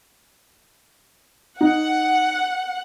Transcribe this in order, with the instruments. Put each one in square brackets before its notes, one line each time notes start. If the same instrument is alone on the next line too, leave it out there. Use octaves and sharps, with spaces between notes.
[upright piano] D#4 [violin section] F#5